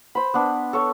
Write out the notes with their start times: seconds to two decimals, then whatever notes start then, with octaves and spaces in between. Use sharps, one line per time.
0.15 C5 B5
0.34 B3 D4
0.73 A4 C#5 A5